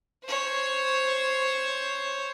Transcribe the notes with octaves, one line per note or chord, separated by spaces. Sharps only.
C5 C#5